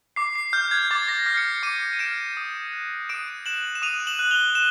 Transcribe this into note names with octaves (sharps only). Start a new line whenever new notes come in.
D6 C7
C7
F6 G6
G#6
D6 A6
A#6
F6 C7
C#7
C7
D6 C#7 D#7
D#7
F6 D7 E7
D#6
F#6
D#6 D7 E7
F#6 E7 F#7
E7
D#6 D#7 F7
F7
E7 F#7
F#6
F7 G7
E7